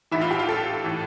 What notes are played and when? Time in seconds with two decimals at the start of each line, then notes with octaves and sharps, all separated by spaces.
0.11 A1 A2 E3 E4
0.21 F4
0.31 G4
0.39 F4
0.49 A4
0.84 A2 E3